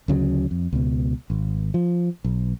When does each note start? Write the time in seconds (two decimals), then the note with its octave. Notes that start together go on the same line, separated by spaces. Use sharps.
0.08 D2 C#3 F#3
0.51 F2
0.73 C#2 B2
1.30 G#1
1.74 F3
2.24 B1